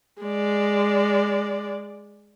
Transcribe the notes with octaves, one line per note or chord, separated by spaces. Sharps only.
G#3 D5